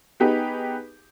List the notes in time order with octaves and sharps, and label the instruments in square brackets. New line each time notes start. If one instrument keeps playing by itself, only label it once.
[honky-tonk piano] B3 D#4 G4 G#4 B4